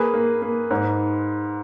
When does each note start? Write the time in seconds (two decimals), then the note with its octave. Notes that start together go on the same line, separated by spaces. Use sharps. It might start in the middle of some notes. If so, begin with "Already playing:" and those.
Already playing: A#3 G#4 B4
0.14 A#3
0.42 A#3
0.71 G#2